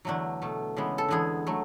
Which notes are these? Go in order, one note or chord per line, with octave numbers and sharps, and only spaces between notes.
E2 D3 F#3 A3 D4
B2 A3
C#3 E3 G#3 B3
A4
E2 D3 G#3 B3 G#4
F#3 A3